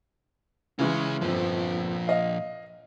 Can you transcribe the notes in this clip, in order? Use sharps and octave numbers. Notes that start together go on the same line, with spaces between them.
C#2 C#3 E3 G#3 C#4
G1 F2 A#2 F3
D#5 F5